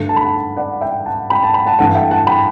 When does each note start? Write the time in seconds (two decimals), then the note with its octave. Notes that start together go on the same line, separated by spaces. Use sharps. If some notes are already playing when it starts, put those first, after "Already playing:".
Already playing: G2 D3 A3
0.09 A5
0.16 B5
0.23 F#5 A5
0.57 D5 F#5
0.81 E5 G5
1.06 F#5 A5
1.30 G5 B5
1.43 A5
1.54 G5 B5
1.66 F#5 A5
1.79 G2 E3 A3 F#5 A5
1.95 E5 G5
2.11 F#5 A5
2.27 G5 B5